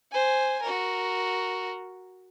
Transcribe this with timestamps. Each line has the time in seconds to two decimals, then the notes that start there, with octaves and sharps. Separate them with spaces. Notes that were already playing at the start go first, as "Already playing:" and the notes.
0.12 C5 G#5
0.62 F#4 A#4